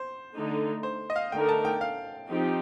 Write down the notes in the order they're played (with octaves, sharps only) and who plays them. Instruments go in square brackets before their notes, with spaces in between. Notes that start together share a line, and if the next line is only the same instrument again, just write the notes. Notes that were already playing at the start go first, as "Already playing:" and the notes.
Already playing: [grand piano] C5
[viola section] D3 A3 D#4
[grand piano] C5
D#5
F5
[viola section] D3 A3 D#4 A#4 [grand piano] G5
[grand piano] A5
G5
F5
[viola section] F3 C4 D#4 G4